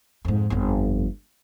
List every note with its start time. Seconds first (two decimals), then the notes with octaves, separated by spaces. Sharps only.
0.25 F2 G#2
0.50 G1 F2